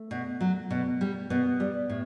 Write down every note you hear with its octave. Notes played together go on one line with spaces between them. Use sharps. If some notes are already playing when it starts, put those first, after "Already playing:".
Already playing: A3
B2
F#3
B2
G3
B2 B3
G3
A2